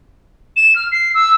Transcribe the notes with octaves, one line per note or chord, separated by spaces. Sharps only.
E7
F6
C7
E6